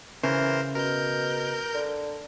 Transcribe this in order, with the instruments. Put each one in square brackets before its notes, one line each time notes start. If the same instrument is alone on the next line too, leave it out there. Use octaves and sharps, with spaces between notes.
[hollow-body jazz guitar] C#3 [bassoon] E3 [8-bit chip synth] A#4 C5
[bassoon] B2 [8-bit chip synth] A#4 G6
[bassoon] D3